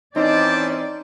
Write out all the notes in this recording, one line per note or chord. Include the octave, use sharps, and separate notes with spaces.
E3 C4 C#4 D#4 C5 D5 G5 A5